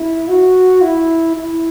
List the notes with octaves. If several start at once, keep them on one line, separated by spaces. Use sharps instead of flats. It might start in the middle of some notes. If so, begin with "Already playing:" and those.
Already playing: E4
F#4
E4
E4